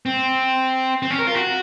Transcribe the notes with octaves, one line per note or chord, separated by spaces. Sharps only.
C4
C4
C#4
A#4
F4
F#4